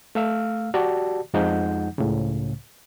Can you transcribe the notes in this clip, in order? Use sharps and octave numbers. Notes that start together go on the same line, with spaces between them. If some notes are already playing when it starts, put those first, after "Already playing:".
A3 F5 E6 F6
F#4 G4 D5 A5
F2 F3 G#3 D#4 F#5 G6
C#2 A2 C#3